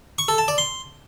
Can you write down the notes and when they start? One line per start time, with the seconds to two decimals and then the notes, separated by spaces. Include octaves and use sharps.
0.19 C#6
0.28 A4
0.38 A5
0.48 D5
0.58 C6